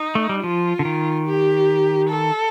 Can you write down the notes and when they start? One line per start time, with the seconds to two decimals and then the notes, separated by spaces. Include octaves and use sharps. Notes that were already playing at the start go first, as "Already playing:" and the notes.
Already playing: D#4
0.15 A3
0.29 G3
0.43 F3 F4
0.79 D3
0.85 D#3
1.27 G4
2.10 A4